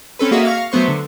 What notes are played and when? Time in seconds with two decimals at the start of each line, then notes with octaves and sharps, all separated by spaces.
0.19 C4 C#4 A4 B4
0.31 A#3 F#4 G#4 A4 D#5 E5
0.45 F5 C#6 A#6
0.72 F#3 A3 B3 C5 C#6
0.88 D3